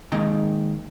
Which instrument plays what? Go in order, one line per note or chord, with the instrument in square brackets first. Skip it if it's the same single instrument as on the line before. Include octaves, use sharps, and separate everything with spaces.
[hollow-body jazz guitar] D#3 G#3 A#3 D#4 G5 A#5